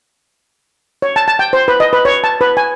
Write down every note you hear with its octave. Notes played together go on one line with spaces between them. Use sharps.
C#5
A5
A5
G5
C5
B4
D#5
B4
C#5
A5
B4
G#5